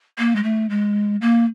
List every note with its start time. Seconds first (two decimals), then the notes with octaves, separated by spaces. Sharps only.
0.18 A#3
0.35 G#3
0.43 A3
0.70 G#3
1.21 A#3